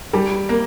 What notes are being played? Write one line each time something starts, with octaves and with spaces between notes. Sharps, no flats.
G3
A#3